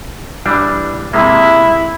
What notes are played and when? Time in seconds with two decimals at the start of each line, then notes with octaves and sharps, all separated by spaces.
0.46 E3 G3 D4
1.13 C3 G#3 A#3 E4